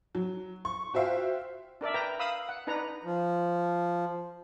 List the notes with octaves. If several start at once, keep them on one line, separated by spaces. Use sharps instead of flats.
F#3
C#6
F4 F#4 C5 E5 F5 G5
D4 A#4 D5 E5
B4 G5 A#5
F5 B5 D#6 E6
F#5
D4 D#4 B4 A#5
F3